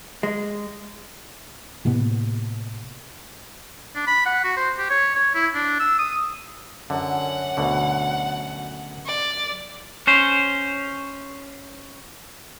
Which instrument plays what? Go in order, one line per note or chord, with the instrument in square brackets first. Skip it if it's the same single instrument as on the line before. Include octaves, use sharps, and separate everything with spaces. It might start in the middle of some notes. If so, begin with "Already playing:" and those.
[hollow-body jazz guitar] G#3
[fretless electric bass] A2 C3 A#3 B3
[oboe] D4
B5
F#5
F#4
C5
G4
C#5
C#5
E4
D4
E6
D#6
[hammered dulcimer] F#2 A#4 [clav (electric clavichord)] D3 [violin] F#5
[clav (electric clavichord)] D2 B2 D3
[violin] D5
[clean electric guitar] C#4 C5